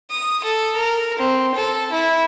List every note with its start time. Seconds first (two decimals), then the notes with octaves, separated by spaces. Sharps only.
0.11 D#6
0.44 A4
0.75 A#4
1.19 C4
1.55 A4
1.92 E4